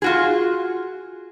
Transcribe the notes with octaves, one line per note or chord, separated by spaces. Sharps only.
F4 F#4 G#4